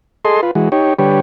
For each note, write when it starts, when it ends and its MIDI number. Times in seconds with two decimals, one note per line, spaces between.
0.25 0.41 68
0.25 0.41 69
0.25 0.41 75
0.25 0.41 84
0.43 0.51 65
0.43 0.51 71
0.55 0.69 52
0.55 0.69 56
0.55 0.69 66
0.72 0.94 63
0.72 0.94 67
0.72 0.94 73
0.99 1.20 50
0.99 1.20 55
0.99 1.20 67
0.99 1.20 71
0.99 1.20 73